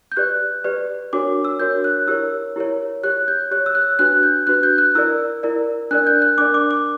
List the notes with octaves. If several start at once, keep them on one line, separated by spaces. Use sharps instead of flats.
G6
G4 B4 D5 F#6
G4 B4 D5
D4 F#4 A#4 C#5 D6
E6
D4 F#4 A#4 C#5 G6
F#6
E4 G4 A#4 C#5 E6
E4 G4 A#4 C#5
G4 C#5 F#6
G6
G4 C#5 F#6
E6
F#6
D4 F#4 B4 F#6
G6
D4 F#4 B4 F#6
G6
F#6
E4 A#4 D5 E6
E4 A#4 D5
D4 A#4 D5 F#6
G6
F#6
D4 A#4 D5 D6
D6
D6